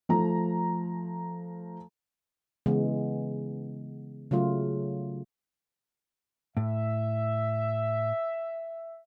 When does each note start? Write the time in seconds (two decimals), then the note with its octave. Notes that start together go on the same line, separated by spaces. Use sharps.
0.09 F3 A3 A#5
2.66 C#3 E3 G#3 B3
4.31 C#3 F#3 A3 F4
6.57 A2 E5